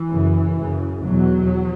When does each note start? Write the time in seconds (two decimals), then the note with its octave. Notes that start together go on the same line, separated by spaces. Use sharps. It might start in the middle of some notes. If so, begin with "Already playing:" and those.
Already playing: E3
0.09 F#2 C#3
0.57 F#2 C#3
1.03 E2 B2 F#3